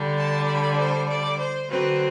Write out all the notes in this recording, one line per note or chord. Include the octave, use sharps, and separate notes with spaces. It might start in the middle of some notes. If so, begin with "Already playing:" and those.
Already playing: D3 G3 D4
A5
B5
C5
D5
C5
D3 F#3 C4 B4